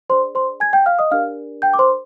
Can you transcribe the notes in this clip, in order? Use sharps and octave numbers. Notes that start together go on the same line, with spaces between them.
D4 G#4 C5 D5 C6
C5 C6
G#5 G#6
G5 G6
F5 F6
D#5 D#6
D4 G4 A#4 D5 F5 F6
G5 G6
D6
C5 C6